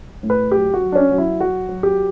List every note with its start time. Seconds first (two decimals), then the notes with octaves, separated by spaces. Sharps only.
0.23 A2
0.30 B4
0.52 F#3 G4
0.74 F#4
0.81 F#3
0.92 D4
0.95 C#4
1.11 F#3
1.18 E4
1.40 F#3 F#4
1.69 F#3
1.83 G4